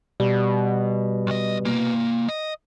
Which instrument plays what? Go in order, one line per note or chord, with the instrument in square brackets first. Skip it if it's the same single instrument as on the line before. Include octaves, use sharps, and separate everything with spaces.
[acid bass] B2 [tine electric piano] G3
[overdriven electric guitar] B1 D#5
C3 A#3
D#5